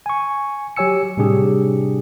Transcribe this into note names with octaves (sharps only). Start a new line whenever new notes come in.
G#5 C#6
F#3 G4 C#5 G#5 E6 C#7
A2 C3 G3 D4 G4 G#4